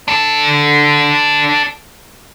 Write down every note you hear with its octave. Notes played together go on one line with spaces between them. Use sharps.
D4 A4